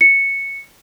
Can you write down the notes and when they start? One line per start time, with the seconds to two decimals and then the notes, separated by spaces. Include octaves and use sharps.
0.01 C#7